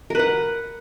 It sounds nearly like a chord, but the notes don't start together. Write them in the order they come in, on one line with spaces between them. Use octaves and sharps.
A#4 B4 F#5